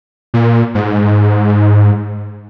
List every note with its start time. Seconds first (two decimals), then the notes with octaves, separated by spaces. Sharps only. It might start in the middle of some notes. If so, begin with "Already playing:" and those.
0.34 A#2
0.75 G#2